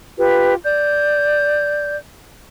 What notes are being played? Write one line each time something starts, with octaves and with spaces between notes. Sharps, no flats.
F4 G4 B4
D5 G6